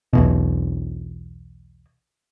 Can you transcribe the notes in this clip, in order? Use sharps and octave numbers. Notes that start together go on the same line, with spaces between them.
B1 E2 B2